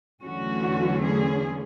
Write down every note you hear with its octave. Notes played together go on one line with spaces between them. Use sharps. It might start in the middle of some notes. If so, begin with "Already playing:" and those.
E2 D3 F#3 A3 C#4 F#4
G#4